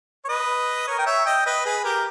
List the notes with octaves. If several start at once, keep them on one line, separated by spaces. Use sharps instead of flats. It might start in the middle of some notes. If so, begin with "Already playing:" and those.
C#5
B4 D#5
A#4 C#5
G5
C#5 E5
D#5 G5
B4 D#5
G#4 B4
G4 A#4